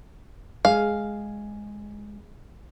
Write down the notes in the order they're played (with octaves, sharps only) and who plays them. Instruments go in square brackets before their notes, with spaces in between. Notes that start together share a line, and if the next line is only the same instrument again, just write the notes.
[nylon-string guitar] G#3 [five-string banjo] F5